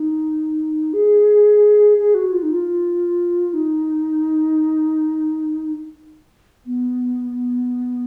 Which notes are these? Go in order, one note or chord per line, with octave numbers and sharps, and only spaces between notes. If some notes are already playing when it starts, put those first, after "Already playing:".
Already playing: D#4
G#4
G#4
F#4
F4
D#4
F4
D#4
B3